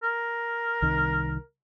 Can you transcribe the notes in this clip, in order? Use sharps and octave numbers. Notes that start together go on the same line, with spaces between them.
A#4
C2 D#3